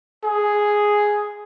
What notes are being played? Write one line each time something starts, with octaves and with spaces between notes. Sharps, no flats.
G#4